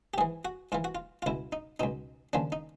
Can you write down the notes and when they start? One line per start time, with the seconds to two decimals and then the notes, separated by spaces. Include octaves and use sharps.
0.14 G4
0.18 G#2 E3 G#4
0.45 F#4
0.72 G#2 E3 F4
0.84 F#4
0.95 F4
1.22 F4
1.26 C#2 B2 E4
1.52 D#4
1.80 C#2 B2 D#4
2.33 D#2 C#3 F3 D4
2.52 D#4